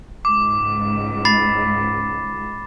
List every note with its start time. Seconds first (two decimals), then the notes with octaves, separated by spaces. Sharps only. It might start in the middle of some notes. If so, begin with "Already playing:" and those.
0.25 C#2 G#2 D6
1.25 B5 A6 C7